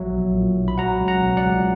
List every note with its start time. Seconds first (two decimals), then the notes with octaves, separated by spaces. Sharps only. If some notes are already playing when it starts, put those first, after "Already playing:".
Already playing: A#1 F#3 E5
0.12 B1
0.34 A#2
0.57 B1
0.68 B5
0.78 F#3 F#5 A#5
1.00 C#2
1.08 F#5 A#5
1.22 B2
1.37 D5 F#5
1.45 C#2